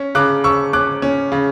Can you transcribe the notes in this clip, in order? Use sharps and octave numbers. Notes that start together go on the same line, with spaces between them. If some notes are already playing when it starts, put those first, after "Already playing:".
Already playing: C#4
C#3 D6 F#6
C#3 C#6 E6
C#4 D6 F#6
C#4
C#3